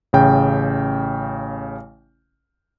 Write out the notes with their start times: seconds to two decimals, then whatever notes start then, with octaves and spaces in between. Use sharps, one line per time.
0.13 A1 C#3 G5